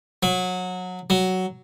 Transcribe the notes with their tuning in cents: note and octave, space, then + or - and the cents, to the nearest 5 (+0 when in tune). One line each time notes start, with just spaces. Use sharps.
F#3 -20
F#3 +10